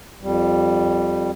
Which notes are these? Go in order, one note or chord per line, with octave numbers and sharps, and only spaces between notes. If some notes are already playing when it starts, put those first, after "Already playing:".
F2 G3